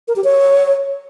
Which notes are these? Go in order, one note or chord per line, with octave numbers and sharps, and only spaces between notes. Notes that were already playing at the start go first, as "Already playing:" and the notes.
A#4
G4
C#5